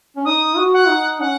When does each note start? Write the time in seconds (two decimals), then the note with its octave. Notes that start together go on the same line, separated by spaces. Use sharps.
0.16 C#4
0.25 D#4 D#6
0.57 F#4
0.73 F#5
0.88 D#4
1.20 C#4 F#5